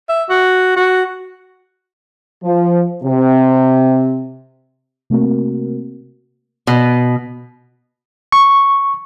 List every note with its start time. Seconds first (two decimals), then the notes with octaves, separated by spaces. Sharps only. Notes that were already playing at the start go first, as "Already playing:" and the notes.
0.09 E5
0.30 F#4
0.77 F#4
2.44 F3
3.03 C3
5.10 C3 A3 A#3 C4 F#4 A#4
6.67 B2
8.32 C#6